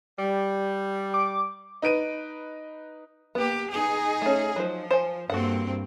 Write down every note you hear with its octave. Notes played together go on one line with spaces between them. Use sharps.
G3
D6
D#4 B4 D7 D#7
A#3 B3 G4
D#4 G#4
A3 C#4
F3 F#3 D#4 C5
C5 G#5
G2 A#3 C4 F#4 A4 F#5